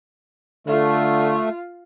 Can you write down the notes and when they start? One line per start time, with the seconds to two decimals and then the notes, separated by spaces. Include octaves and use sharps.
0.67 D3 A3 F4